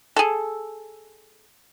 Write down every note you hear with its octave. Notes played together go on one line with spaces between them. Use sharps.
G#4 A4